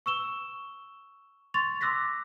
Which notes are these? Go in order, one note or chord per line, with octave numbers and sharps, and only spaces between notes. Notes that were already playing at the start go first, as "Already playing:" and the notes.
C#6 E6 E7 G7
C6 C#6 A6 F7
C6 D6 E6 F#6 A#6 B6